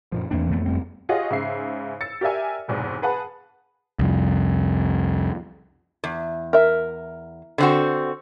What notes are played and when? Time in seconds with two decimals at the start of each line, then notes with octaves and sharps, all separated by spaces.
0.12 F#2 A#2 F3
0.31 E2 E3 A3 A#3 C4 D4
0.50 F2 A3 B3
0.66 F#1 G3 C4
1.09 F4 G4 G#4 C#5 D#5 F#5
1.31 G#2 C#3 E5 C7
2.01 E6 A6 C#7
2.21 G4 A#4 D5 E5 G#5
2.68 F1 B1 E2 G#2
3.02 G#4 B4 F#5 A5
3.99 C2 F2
6.04 E2
6.53 A#4 E5
7.58 D3 C4 F#4